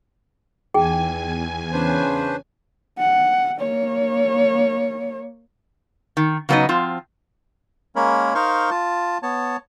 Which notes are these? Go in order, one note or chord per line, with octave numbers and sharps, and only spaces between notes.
E2 D#4 G#4 G5 G#5
C#3 C#4 D4 B4 C5
F#5
A#3 C#5
D#3
C#3 F#3 B3 C4 D#4 D#5
F3 C4 F4
G#3 A#3 C#4 A#4 C#5 B5
D#4 A#4 C5 F5 C6 C#6
F4 A5
B3 C#5 A5